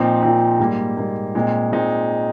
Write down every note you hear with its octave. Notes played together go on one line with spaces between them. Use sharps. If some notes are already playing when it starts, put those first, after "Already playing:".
Already playing: A#2 F3 C4 D#4
A#2 F3 C4 D#4
G#2 G3 A#3
G#2 G3 A#3
A#2 G#3 C4 D#4
A#2 G#3 C4 D#4